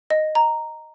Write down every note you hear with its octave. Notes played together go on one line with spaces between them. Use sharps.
D#5
A#5